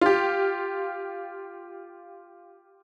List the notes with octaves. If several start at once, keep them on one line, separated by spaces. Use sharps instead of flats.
F4 G4